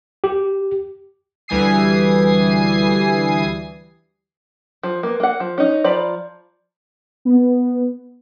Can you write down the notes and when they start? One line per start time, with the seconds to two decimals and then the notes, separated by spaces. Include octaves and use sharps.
0.24 G4
1.48 D2 E3 G3 G#5 D#6 C7
4.83 F3
5.03 A#3 B3
5.20 A#3 F#5
5.40 F3
5.58 C#4 D#4
5.84 F3 D5 A#5 B5
7.25 B3